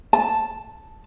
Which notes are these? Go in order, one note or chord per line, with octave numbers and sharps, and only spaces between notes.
A5